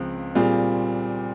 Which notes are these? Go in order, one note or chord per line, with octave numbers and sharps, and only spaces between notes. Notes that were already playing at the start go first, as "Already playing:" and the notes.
Already playing: C#2 C#3 F3 C4
A#2 G3 C4 F4 G#4